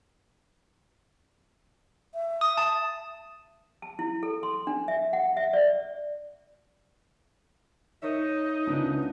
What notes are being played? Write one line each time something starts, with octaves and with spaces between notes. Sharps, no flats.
E5
D#6
A5
A5
E4
A4
C6
D4
E5
F#5
E5
D5
D#4 A#4 C#5 E5
C#2 C#3 B3 D4